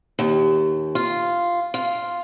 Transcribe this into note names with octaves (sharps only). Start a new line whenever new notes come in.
D#2
F4
F4